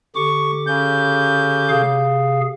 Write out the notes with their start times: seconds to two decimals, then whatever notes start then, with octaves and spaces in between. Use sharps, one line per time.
0.16 D3 G4 C#6 D6
0.67 C#3 G6
1.69 C3 G#4 F5